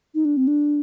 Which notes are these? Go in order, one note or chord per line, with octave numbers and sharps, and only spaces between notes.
D#4
D4
C4
D4